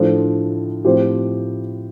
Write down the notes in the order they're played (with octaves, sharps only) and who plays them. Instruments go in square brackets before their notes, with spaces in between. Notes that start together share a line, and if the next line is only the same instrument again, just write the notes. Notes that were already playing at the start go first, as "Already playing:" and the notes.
Already playing: [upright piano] A2 F3 D4 A4 C5
A2 F3 C4 G4 C5